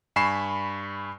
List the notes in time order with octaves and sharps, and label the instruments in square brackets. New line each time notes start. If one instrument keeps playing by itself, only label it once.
[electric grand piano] G2 G#5 B5 C#6 C7 E7